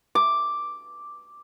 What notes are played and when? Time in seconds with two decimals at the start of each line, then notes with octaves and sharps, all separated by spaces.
0.15 D6